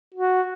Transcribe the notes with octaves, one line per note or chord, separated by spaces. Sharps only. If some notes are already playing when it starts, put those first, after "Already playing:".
F#4